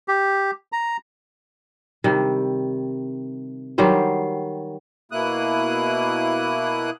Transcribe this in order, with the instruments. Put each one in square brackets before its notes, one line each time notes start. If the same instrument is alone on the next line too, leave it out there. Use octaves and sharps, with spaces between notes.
[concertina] G4
A#5
[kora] C3 D#3 G3
D#3 F#3 G3 C5
[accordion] B2 A#3 E4 D#6 F#6